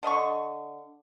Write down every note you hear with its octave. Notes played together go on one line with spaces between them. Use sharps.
D3 D#5 B5 C#6